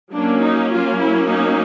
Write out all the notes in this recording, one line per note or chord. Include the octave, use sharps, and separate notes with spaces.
F#3 A#3 C#4 D4
D#4
F4
E4
D#4